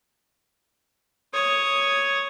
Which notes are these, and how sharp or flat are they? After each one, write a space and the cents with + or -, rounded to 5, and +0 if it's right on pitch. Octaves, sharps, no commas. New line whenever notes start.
C#5 +0 D#6 +0